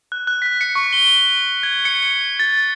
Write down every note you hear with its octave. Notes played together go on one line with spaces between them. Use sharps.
F#6
F#6
B6
C#7
C#6
G7
G#6
C#7
A6